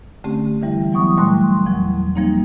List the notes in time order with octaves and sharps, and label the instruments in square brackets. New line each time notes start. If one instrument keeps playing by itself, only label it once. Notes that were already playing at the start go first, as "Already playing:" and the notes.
[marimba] D3 A3 C4 C#4 G4
D3 E3 G3 E4
E3 F#3 B3 C#6 D#6
A#2 G3 A3 C6 F#6
E2 F3 F#3
F3 G3 A#3 C4 D#4